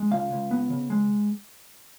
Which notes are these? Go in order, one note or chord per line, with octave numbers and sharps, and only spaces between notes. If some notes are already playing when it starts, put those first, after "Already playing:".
Already playing: G#3
C#2 F5
C#2
B3
C#3
G#3